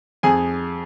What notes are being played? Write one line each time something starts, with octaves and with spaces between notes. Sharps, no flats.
F2 G#4 G#5